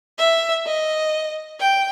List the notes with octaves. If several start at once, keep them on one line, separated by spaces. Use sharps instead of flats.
E5
D#5
G5